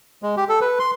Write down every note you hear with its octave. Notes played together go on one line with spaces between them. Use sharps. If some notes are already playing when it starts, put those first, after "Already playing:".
G#3
G4
A4
B4
C6